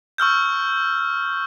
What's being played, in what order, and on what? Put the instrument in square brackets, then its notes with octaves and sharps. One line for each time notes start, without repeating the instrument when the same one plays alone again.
[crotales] C#6 E6 F6 G6